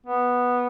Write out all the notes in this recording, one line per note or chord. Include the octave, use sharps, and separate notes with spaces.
B3